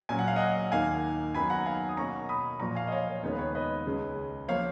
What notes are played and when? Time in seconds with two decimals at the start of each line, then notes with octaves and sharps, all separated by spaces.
0.09 A#2 F#3 C#4 G#5
0.19 F#5
0.28 F5
0.36 D#5 F#5
0.72 D#2 D#3 A#3 F5 G#5
1.35 F#2 D#3 F#3 B3 G#5 B5
1.50 F#5 A#5
1.66 F5 G#5
1.89 D#6
1.97 B2 A#3 C#4 A#5 C#6
2.29 B5 D#6
2.60 A#2 F3 A#3 A#5 C#6
2.75 F5 G#5
2.87 D#5
2.92 C#5 F5
3.07 C#5
3.23 D#2 C#3 G#3 B3 C#5
3.33 B4
3.39 C#5
3.55 B4 D#5
3.86 C#2 C#3 G#3 C#4
4.48 F3 A#3 C#5 F5